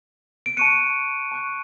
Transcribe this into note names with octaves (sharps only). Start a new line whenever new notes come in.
D7
A5 C#6 F#6 C#7 D#7
A5 C#6 F#6